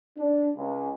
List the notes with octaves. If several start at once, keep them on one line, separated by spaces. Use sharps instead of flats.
D4
C#2